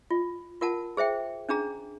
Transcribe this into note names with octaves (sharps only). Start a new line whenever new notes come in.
F4
F4 A#4 F#5 A5
G#4 C5 E5 G5
C#4 D4 G#4 A#5